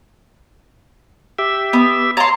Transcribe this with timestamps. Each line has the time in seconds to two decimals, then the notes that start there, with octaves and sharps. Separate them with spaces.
1.39 G4 E5
1.73 B3
2.17 C#5 A5 A#5 C6